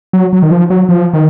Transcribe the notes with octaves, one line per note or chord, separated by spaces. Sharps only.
F#3
F#3
D#3
F3
F#3
F3
D#3